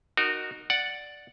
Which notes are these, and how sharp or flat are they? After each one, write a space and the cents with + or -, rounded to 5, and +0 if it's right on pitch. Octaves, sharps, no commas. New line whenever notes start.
D#4 -25 F#4 +0 A#4 +0
D5 +0 F#5 +0